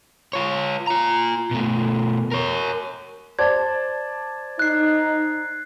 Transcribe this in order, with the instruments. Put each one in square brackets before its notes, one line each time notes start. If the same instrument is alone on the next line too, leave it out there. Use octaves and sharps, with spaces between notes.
[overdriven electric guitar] F4 C#5
F4 A#5
B2 A3
A#4 C#5
[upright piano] C5 D5 A5 [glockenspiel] G#6 A6
[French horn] D#4 [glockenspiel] F#6 C7